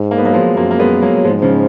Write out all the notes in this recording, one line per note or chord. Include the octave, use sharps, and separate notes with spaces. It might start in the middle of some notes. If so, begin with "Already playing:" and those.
Already playing: G#2
A#3
B3
F#3 A#3
F3 G#3
F#2 F#3 A#3
A#3
G#3 B3
F#3 A#3
F#3
G#2 F3 G#3
C#3 F3